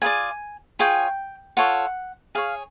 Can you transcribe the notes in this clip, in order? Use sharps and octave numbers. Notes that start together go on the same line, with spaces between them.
F4 G#4 B4 D5 G#5
F4 G#4 C#5 G5
F4 A4 C#5 F#5
G#4 C#5 F5